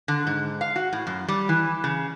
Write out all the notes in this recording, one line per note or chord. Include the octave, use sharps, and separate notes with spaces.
D3
G#2
F5
F#4
A2
F#2
G3
E3
C#3